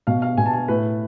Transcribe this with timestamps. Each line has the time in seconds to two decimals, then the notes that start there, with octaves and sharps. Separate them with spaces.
0.07 B2 F5
0.22 F5
0.37 B2 G#5
0.46 A5
0.53 G#5
0.68 A2 B4